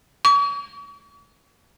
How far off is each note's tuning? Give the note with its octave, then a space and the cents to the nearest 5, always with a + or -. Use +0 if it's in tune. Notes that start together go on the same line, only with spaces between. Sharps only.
C#6 +40